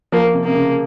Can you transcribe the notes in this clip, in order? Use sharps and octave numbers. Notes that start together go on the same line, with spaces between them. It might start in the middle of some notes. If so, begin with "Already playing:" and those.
F3 A#3
C3
C3 A#3
C#3